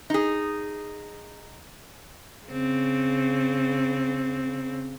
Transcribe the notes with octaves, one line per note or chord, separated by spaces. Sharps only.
D#4 G#4
C#3 C4